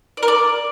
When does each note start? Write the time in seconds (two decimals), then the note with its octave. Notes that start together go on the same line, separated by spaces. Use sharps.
0.17 D5
0.23 A#4
0.28 D5